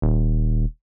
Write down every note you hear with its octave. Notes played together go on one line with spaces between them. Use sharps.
D#1